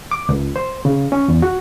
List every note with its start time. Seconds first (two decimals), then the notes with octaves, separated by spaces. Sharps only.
0.11 D6
0.29 C#2
0.56 C5
0.85 C#3
1.12 C#4
1.28 E2
1.42 F#4